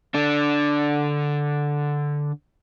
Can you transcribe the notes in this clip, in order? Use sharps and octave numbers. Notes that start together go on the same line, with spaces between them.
D3 D4